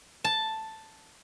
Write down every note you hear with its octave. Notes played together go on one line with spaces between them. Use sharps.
A5